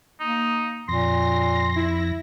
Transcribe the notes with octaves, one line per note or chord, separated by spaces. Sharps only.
A#3 D#4
F2 A#2 C6 A#6
E4